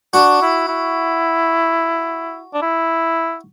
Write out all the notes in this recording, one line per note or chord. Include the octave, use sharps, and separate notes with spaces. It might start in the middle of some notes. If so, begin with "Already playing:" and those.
D4 F#4
E4
E4
D4
E4